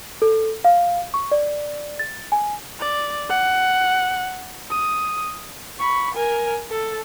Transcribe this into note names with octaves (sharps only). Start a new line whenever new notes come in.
A4
F5
C#6
D5
A6
G#5
D5
F#5
D#6
B5 C#6
A#4 G#5
A4